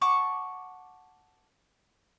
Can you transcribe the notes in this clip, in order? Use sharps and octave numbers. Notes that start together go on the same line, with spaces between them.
F#5 A5 C#6 D6